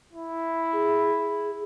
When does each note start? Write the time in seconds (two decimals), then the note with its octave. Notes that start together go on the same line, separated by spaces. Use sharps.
0.13 E4
0.73 G#4